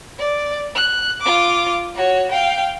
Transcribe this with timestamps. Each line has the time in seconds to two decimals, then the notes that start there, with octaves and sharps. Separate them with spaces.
0.19 D5
0.75 F#6
1.21 F4 D6
1.95 F#4 C#5
2.31 F5 G5